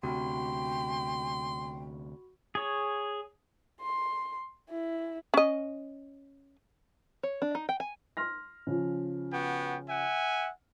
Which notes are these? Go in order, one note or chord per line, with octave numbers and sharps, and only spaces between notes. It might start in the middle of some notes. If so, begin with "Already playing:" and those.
D2 C3 F#4 G5 B5 C6
G#4 C#5
C6
E4
C#4 D#5
C#5
D4
D#4
G5
G#5
C6 F6 A#6
C#3 F3
B3 F#4 G5
E5 F#5 G#5